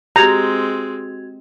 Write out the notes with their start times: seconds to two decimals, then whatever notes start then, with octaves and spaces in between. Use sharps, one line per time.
0.16 G#3 C4 F#4 G4 A#5 G#6 F7